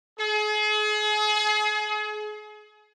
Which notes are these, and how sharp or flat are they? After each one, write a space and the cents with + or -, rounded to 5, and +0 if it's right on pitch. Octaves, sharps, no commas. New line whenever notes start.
G#4 +35